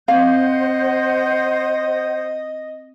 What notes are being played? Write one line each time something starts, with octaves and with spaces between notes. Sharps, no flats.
C4 C5 D#5 F5 F#5 G6